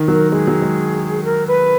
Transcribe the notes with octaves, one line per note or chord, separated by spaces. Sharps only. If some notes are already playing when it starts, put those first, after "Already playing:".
Already playing: D#3
F#3 A#4
G#3 G#4
F#3
G#3
A#4
B4